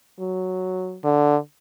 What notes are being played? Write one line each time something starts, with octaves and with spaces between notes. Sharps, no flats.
F#3
D3